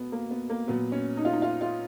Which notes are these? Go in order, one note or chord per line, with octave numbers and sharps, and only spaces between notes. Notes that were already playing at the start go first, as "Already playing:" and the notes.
Already playing: B2 B3
A#3
B3
A#3
A#2 F#3 B3
C#4
D#4
F4
D#4
F4
F4